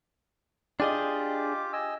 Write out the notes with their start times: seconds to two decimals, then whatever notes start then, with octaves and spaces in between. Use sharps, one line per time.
0.80 D4 F4 G4 G#4 D#5 D6
1.73 D#5 G#5 E6